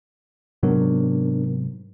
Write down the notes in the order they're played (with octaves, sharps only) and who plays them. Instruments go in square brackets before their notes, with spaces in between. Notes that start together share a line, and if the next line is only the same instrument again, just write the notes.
[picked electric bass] G#2 C3 F#3 [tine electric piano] B3 D4 A#4